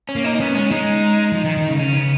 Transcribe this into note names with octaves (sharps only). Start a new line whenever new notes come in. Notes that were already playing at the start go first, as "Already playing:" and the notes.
C#4
A#3
D#4
D#4
B3 C#4
G#3 C#4
G#3 D#4
F3
D#3
D#3
C#3
C#3 C#4
B3